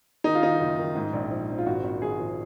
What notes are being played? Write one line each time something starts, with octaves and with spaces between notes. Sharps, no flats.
D#3 D#4
F4
D#3 D#4
F#1
D#3
G#2
A#1
F3
A#1
F4
G#1 F#4
G#1
G#1 G#4
F3